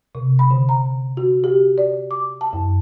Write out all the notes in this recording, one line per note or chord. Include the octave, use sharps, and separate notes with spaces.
C3
B5
D3
A#5
F#4
G4
D5
D6
A5
F#2